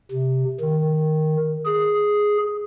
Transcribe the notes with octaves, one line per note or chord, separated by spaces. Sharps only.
C3
D#3
G#4